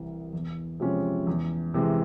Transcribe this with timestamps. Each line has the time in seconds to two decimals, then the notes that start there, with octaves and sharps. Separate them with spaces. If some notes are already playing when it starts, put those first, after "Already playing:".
Already playing: C2 C3 E3
0.33 E2
0.80 C3 F3 G#3 C#4
1.27 E2
1.74 C3 E3 G#3